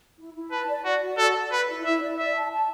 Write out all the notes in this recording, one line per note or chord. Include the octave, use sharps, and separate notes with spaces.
E4
E4
B4 A5
D5
F#4 D5
F#4
A4 D5
D5
B4 B5
E4
E4 E5
D5
D5 E5
A5
A5